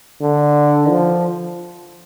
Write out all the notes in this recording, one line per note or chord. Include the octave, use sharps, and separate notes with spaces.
D3
F3